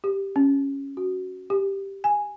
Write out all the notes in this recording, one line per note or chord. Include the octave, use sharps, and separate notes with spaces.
G4
C#4
F#4
G4
G#5